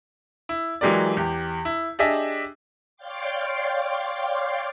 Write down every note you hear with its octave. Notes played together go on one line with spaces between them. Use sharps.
E4
E3 F#3 G#3 G4 A#4 D5
E2 G4
E4
D4 G4 G#4 D#5 E5
C#5 D5 F5 G5 C6 D6